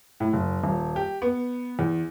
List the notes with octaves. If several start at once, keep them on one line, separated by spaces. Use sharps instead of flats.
A2
F#1
D#1
G4
B3
E2